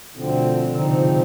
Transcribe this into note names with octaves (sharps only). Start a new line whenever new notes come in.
D2 B2 D3 F3 C4
D#3
D3
G#2 C3 F3 C4 D#4
C3